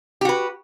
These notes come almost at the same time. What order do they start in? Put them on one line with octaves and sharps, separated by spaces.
G4 F#4 B4